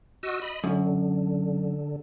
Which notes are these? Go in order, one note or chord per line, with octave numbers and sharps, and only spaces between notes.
F#4 D#5 E6
D#5 B5
F#2 D3